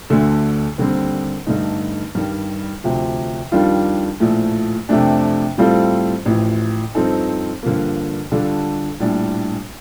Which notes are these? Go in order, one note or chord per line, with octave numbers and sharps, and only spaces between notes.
D2 D3 A3
D#2 D3 G3 C4
G2 D3 A3 D#4
G2 D#3 G3
D2 C3 F3
F2 D#3 G3 D4 F4
A#1 A2 F3 A3
F2 C3 F3 A3 D4
A2 G3 C4 F4 A4
A1 A2 F3
G2 F3 C4 D#4 A4
G2 D3 F3 A#3
D3 G3 D4 F4 A4
A#1 A2 G3 D4